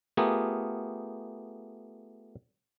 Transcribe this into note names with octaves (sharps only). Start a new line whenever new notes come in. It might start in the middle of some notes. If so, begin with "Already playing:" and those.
A3 B3 F4 G4 G#4 A#4